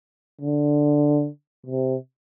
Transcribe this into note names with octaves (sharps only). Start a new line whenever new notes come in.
D3
C3